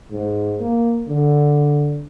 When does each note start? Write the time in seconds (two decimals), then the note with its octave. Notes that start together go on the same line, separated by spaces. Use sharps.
0.11 G#2
0.60 A#3
1.08 D3